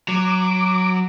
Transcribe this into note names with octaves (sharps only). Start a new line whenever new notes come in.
F#3 D6